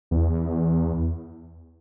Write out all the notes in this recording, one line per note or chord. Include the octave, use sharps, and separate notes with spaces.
E2